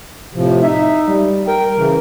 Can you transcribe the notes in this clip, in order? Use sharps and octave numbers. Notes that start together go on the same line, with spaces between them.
A2 C3 F3
D#4 E5
G3
A#4 G5
C#3 E3